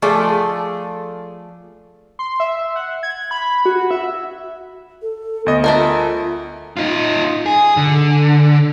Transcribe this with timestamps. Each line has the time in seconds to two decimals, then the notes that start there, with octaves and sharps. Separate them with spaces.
0.02 F3 A3 G#4 A4 D5
2.19 C6
2.40 E5
2.76 F#5
3.03 G#6
3.31 B5
3.66 F#4
3.91 E5
5.02 A4
5.46 D2 B3 D#5
5.64 A3 F4 A4 A#4
6.77 D#4 F4
7.46 G#4
7.77 D3